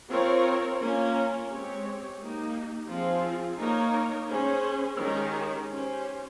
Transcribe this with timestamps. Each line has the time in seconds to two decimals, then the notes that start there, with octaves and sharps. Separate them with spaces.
0.10 C4 F4 A#4 C#5
0.80 A#3 C#4 F4 A#4
1.50 G#3 C4 G4 C#5
2.19 A#3 D#4 G4
2.90 F3 C4 F4 G#4
3.60 A#3 D#4 A#4 C#5
4.29 C#4 G#4 C5
4.99 D#3 G#3 C#4 G4 A#4
5.69 C#4 G4 C5